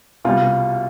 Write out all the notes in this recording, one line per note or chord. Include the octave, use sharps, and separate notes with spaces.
C2 B2 G3 F4